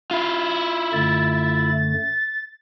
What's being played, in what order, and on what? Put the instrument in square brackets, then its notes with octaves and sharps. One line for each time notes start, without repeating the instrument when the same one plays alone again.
[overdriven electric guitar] E4 F4
[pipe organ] F#2 D3 A3 [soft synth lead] A6